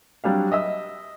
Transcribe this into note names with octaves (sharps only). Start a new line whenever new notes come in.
F#3 G3 D4 F5
D#5 E5 E6